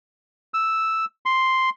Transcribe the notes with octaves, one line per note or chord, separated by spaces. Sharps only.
E6
C6